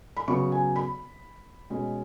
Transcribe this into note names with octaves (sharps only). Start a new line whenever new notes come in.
B5
C#3 F#3 B3 C#6
G#5
B5
B2 G#3 C#4